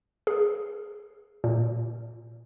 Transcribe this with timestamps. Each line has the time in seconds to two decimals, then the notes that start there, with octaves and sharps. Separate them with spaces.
0.27 G#4
1.44 A#2